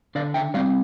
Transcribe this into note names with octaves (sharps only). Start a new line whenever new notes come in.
D3 D5 F5
E5 G5
G3 C4 D5 F5